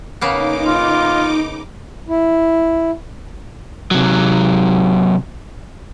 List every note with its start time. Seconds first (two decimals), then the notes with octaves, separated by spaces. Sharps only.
0.21 C#3 A#3 B3 D#4 D6
0.66 F4
2.08 E4
3.91 C3 F#3